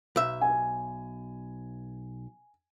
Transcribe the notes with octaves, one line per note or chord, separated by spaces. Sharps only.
B1 E5
G#5